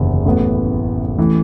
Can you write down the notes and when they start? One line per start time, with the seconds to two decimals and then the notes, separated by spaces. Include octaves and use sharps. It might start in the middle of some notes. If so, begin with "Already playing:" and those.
Already playing: F#1 E2 C3 D#3
0.25 A1 A2 E3 B3
1.18 A1 A2 E3